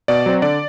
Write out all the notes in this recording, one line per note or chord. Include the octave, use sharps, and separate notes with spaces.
B2 D5
F#3 C4
D3 D5